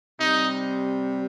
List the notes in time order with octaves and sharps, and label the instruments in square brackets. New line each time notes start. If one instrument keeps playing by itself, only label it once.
[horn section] C3 G3 D#4